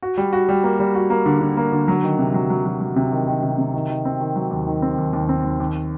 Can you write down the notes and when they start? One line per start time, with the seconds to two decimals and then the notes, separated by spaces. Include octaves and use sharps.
0.03 F#4
0.17 G3
0.33 F#4
0.49 G3
0.64 A#3
0.80 G3
0.95 F#4
1.10 A#3
1.26 D3
1.41 D3
1.57 A#3
1.72 D3
1.88 F#3
2.03 D#3
2.19 C3
2.34 F#3
2.50 F#3
2.65 F#3
2.80 F#3
2.96 C3
3.12 D#3
3.27 D#3
3.43 C3
3.58 C3
3.74 D#3
3.89 D#3
4.05 C4
4.20 D#3
4.36 F#3
4.51 D#2
4.67 D#3
4.82 C4
4.98 D#2
5.13 D#2
5.29 C4
5.44 D#2
5.60 D#2